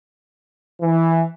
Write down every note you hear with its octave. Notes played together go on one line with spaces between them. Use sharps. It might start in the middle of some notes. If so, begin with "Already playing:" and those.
E3